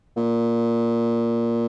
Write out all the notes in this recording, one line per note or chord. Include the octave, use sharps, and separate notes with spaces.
A#2